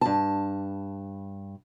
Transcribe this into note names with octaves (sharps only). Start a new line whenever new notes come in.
G2 A5